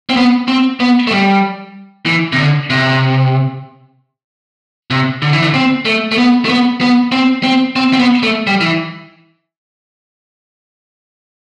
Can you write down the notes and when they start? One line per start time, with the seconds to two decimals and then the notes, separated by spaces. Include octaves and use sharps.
0.10 C4
0.16 B3
0.48 C4
0.80 B3
1.07 A3
1.11 G3
2.06 E3
2.32 C3
2.38 D3
2.70 C3
4.91 C3
5.22 D3
5.33 E3
5.42 D3
5.54 C4
5.85 A3
6.12 A3
6.18 B3
6.45 A3
6.49 B3
6.81 B3
7.12 C4
7.43 C4
7.76 C4
7.93 C4
7.99 B3
8.23 A3
8.47 G3
8.61 E3